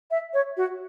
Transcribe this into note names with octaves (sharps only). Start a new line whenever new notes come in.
E5
C#5
F#4